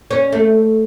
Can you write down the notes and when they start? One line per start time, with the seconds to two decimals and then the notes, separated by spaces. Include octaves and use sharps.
0.11 C#4
0.32 A3